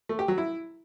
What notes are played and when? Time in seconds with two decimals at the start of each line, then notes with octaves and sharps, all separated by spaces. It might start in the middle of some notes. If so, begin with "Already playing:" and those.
0.09 A3
0.19 G4
0.28 F#3
0.38 E4